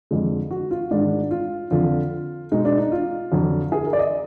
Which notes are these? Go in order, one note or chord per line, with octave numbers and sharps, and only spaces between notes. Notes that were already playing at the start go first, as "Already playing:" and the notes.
F2 D3 G#3
F#4
F4
G#2 D#3 G#3 D4
F4
F2 D3 F3 F4
B2 G#3 D#4
D4
D#4
F4
F2 D3 F#3
G#4
A#4
D5
D#5